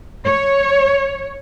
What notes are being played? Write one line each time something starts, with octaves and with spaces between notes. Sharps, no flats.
C#5